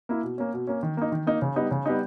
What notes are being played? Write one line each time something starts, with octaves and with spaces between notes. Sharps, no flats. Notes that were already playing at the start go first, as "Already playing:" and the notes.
A#3 E4
B2
A#3 C#4
B2
A#3 C#4
D#3
A#3 D#4
D#3
A#3 D#4
C#3
G3 B3 D#4
C#3
G3 B3 D#4